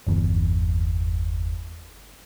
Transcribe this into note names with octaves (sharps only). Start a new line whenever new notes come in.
G1 E2